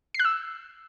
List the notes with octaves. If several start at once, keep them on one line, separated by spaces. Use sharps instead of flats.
C7
F#6
E6